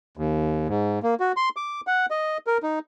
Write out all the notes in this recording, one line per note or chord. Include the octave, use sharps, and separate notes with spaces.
D#2
G#2
A#3
F#4
C6
D6
F#5
D#5
A#4
D#4